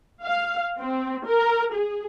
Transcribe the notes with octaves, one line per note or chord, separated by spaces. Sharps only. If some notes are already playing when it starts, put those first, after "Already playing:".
F5
C4
A#4
G#4